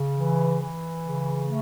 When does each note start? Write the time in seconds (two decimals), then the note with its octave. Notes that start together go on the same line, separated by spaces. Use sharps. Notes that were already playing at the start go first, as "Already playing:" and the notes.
Already playing: C#3
0.17 E3
0.60 E3
1.03 C#3
1.45 A3